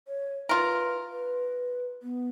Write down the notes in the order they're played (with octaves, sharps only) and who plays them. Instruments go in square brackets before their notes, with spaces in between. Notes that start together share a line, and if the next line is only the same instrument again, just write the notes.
[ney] C#5
[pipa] F4 A#4 [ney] B4
[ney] B4
B3